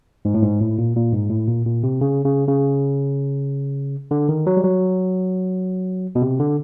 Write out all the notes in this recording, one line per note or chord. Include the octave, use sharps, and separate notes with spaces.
G#2
A2
G#2
A2
A#2
A#2
G#2
A2
A#2
A#2
C3
C#3
C#3
C#3
D3
D#3
F#3
G3
F#3
B2
C3
D3